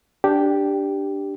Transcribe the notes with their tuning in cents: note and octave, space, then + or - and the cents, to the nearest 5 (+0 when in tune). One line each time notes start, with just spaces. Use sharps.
D4 +0 G4 +0